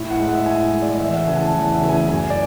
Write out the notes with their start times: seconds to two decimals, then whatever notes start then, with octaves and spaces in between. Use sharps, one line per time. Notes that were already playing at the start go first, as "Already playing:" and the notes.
Already playing: A2
0.11 F#5
0.19 G#3
0.28 E5
0.46 A2 G#5
0.72 G#3
0.82 D5
1.00 E2 E5
1.13 F#5
1.26 C#3 E3 A3 G#5
1.40 A5
1.53 E2 F#5
1.72 E5
1.80 C#3 E3 A3
1.89 G#5
2.08 F#2 G#5
2.30 D5